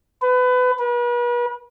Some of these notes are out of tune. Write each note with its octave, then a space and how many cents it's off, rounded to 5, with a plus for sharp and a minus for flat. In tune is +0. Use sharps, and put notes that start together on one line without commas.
B4 +25
B4 -40